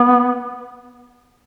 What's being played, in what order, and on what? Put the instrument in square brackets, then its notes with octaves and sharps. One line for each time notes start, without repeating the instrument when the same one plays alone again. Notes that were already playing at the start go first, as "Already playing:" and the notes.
Already playing: [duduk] B3